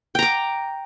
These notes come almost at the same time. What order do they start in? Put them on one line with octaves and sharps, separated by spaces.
G5 A#5 D6